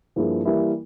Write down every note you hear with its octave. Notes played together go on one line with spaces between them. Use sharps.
G2 F3 A#3 E4 G#4
E3 G3 A#3 E4 A#4